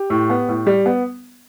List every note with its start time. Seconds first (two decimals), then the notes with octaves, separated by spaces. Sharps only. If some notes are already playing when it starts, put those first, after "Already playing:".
Already playing: G4
0.10 A2
0.30 B3
0.48 A2
0.67 G3
0.86 B3